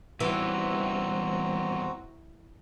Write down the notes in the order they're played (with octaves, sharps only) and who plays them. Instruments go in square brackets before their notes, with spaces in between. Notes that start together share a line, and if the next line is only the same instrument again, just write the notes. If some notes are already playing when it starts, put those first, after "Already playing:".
[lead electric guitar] E2 G3 [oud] E3 [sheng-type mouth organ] C4 F#4 A#5